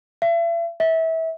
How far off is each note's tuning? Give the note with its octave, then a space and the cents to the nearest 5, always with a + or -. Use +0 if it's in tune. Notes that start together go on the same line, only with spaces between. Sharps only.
E5 +40
E5 -25